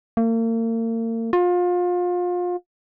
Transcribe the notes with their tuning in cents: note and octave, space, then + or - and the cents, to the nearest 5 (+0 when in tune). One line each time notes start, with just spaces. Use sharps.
A#3 -40
F4 +30